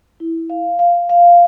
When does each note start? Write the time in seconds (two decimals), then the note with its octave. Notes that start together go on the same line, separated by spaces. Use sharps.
0.20 E4
0.50 F5
0.79 F5
1.09 F5